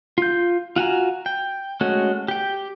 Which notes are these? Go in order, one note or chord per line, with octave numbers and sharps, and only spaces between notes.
F4 G6
F4 F#4 G#5 A#5
G5
G#3 A3 C#4 F#4
G4 G5